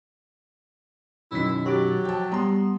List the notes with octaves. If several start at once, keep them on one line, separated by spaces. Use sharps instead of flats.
F#2 B2 D#3 E4 B6
F#3 G4 D6 A6
F3 G5 A5
G3 B3 A#5 C6